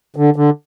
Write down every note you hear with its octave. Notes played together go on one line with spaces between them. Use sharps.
D3
D3